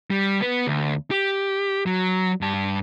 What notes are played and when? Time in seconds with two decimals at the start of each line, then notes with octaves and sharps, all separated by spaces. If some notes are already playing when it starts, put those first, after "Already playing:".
0.10 G3
0.41 B3 B4
0.67 D2
1.11 G4
1.86 F#3
2.41 G2 A5